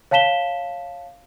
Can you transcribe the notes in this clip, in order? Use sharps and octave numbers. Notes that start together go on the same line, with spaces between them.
C#5 F5 A5 B6 E7 G7